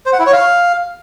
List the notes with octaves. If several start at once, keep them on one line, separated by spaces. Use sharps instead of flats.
C5
F#5
E4
C#5
F5